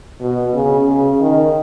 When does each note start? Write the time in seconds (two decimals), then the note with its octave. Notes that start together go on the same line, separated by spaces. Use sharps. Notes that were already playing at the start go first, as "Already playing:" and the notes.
0.21 B2
0.54 C#3
0.87 C#3
1.20 D#3